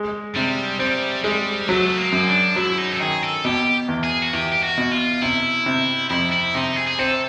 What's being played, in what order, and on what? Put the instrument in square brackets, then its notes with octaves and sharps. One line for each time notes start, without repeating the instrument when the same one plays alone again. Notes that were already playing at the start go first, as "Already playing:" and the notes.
Already playing: [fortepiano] G#3
[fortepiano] C3 [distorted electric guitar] G3
[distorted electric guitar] G3 [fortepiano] C4
[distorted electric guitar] G3 [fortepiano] G#3
[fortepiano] F#3 [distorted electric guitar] A3
[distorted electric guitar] A#3
[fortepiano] F#2
[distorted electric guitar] D4
[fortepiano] F#3 [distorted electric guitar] E4
[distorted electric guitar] D#4
A4
[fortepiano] D#3 [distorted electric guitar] G#4
[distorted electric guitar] A4
[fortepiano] B2 [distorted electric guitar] G4
[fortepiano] E2
[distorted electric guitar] G#4
F#4
[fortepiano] E2 [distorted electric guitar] G4
[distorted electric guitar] G4
F#4
[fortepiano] B2
[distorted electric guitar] F4
[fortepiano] C3 [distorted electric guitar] E4
[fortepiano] C3
[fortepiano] F2 [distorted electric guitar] E4
[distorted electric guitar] E4
[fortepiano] C3 [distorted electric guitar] D#4
[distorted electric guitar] G#4
G#4
[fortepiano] C4 [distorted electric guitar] A4